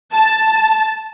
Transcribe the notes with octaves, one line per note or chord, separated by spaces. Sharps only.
A5